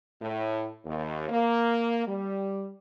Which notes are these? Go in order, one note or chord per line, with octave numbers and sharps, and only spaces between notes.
A2
D#2
A#3
G3